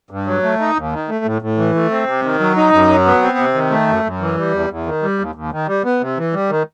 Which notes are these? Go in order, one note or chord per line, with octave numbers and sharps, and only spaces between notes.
G2
F#3
A3
D#4
D#2
D#3
A3
A2
A2
E3
A3
C4
C3
D#3
F#3
D#4
F#2
F#3
B3
C4
C3
D#3
A3
F#2
F#2
E3
G3
E2
E2
D#3
G3
D#2
D#2
D#3
G3
B3
C3
E3
G3
D#3